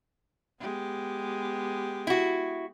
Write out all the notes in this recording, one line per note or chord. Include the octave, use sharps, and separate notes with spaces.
G#3 B3 G4
E4 F#4